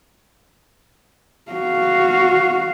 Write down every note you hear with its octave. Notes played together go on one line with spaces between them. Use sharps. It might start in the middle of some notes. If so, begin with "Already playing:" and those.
F#4 F5